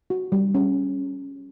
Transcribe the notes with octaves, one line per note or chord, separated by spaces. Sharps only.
F#4
G3
C#4